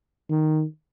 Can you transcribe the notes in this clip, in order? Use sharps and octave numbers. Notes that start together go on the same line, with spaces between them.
D#3